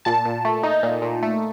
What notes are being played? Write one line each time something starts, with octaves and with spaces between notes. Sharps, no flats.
A#2 A5
A#2
A3
D#4
A#2
A#2
A3